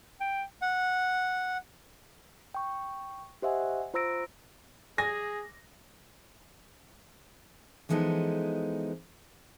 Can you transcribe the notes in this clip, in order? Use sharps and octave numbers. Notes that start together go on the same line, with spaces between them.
G5
F#5
G5 C#6
G4 C5 D#5 E5 F#5 G#5
F4 C5 A#5 E6 A#6 D7
G#4 G#5 A#6
E3 F3 G#3 B3 D#4 A4